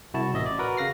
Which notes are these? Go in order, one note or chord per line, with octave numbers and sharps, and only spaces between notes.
C2 E4 F#4 A5
A1 D#5 E5
D5
F#4 A#4 B4
C#3 F5 A#6 C7